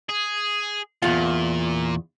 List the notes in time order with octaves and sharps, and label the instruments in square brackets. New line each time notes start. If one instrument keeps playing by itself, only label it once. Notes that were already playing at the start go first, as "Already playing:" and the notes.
[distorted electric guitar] G#4
[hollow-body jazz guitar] E2 F4 [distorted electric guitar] A#2